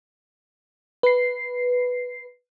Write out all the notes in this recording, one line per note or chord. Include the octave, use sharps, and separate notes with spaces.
B4 C7